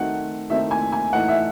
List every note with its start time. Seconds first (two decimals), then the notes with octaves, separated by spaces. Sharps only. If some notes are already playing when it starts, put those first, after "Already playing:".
Already playing: D#3 F#3 A3 C4 D#4 F#5
0.50 D#3 F#3 A3 C4 D#4 E5
0.71 G#5
0.92 G#5
1.13 A2 E3 A3 D#4 F#5
1.28 E5